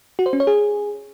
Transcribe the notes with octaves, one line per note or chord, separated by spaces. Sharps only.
F#4
C5
C#4
C#5
G#4